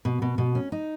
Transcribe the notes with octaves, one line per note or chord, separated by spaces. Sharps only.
B2
B2
B2
C#4
D#4